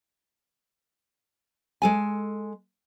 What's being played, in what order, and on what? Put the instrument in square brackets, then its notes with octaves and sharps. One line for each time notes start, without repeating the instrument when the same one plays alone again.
[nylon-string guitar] G#3 A4 G#5